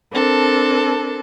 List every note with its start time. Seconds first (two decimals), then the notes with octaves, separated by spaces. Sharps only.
0.11 C4 D4 A4 A#4